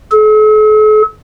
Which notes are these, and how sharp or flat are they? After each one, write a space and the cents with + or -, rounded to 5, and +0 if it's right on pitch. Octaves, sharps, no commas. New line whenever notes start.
A4 -45